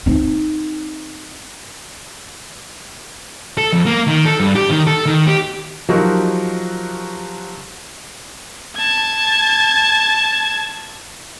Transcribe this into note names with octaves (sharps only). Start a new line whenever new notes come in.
C4 D#4
A4
F2
A#3
D#3
A4
G2
G4
D#3
A4
D#3
G4
F3 F#3 D#4 F#4 G4 A#4
A5 G#6